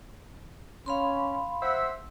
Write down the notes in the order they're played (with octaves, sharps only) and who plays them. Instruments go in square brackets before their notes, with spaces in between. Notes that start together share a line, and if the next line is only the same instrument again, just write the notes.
[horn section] C#4 [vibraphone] F5 B5 C6
[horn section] C5 E5 F#5